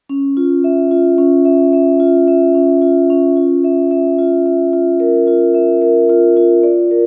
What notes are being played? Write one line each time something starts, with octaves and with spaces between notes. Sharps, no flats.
C#4
F4
E5
F4
C#4
E5
E5
F4
E5
C#4
F4
C#4
F4
E5
E5
F4
E5
F4
A#4
F4
E5
A#4
F4
F4
D5
A#4